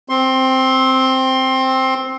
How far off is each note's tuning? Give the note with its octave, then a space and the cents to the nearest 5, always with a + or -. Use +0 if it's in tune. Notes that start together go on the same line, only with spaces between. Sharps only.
C4 +0 C6 +20